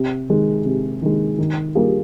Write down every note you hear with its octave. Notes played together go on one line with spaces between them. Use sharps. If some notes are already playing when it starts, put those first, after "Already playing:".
Already playing: C3
D#3 G#3
C3
D#3 G#3
D#3
G3 A#3 F4 G#4